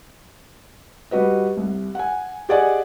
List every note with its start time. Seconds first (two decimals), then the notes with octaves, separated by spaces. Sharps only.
1.11 G3 F#4 B4 D#5
1.57 C2
1.95 F#5 G#5
2.49 G4 G#4 D5 D#5 F#5 G#5